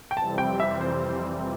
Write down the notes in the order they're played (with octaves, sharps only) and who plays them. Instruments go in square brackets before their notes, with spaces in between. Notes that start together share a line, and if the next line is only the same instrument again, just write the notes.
[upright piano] G5
[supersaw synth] F2 C3 E3 G3 C4 [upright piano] A5
[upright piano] G5
E5
C5